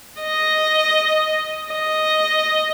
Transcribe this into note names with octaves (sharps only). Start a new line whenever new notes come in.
D#5
D#5